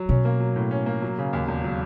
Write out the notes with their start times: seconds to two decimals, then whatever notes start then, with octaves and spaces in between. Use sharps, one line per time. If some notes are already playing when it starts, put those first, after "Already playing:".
Already playing: F#3
0.09 B2 C#4
0.25 A#3
0.40 F#3
0.56 A2
0.71 C#4
0.86 A#3
1.02 F#3
1.18 C#3
1.33 D#2
1.48 E1
1.64 F#3